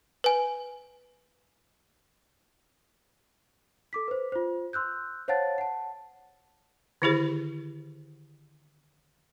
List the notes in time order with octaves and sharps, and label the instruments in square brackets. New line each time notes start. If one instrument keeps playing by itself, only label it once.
[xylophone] B4 G#5
[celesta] A4 D6 B6
B4 C5
F4 C5
C6 E6 F#6 G6
C5 C#5 F5 F#5 A5 A6
F#5 A5
[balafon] D3 D#3 E4 G4 G#4 C5